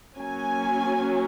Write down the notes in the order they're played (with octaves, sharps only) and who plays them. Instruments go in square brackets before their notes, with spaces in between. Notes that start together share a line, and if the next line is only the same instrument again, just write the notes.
[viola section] F#3 A#3 C#4 G#5